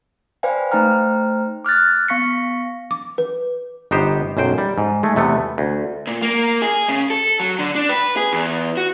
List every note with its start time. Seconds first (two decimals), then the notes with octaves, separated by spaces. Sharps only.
0.43 B4 C5 D5 F5 G5 G#5
0.72 A3 D#4 C5 G5 A#5 F6
1.65 D6 F6 F#6 A6
2.08 B3 F5 C#6 A#6 B6 C#7
2.91 D6
3.18 B4
3.91 G1 B3 D#4 G4 C5
4.37 B1 F#2 C5 G5
4.58 G3
4.78 G#2
5.03 G#3 A3
5.15 E2 C3 A3 B3
5.58 D2
6.07 A#2
6.22 A#3
6.62 G#4
6.89 C#3
7.10 A4
7.40 F#3
7.59 D3
7.76 D4
7.89 B4
8.17 G#4
8.33 E2
8.77 F#4